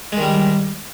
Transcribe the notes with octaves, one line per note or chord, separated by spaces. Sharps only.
D#3 G3 G#3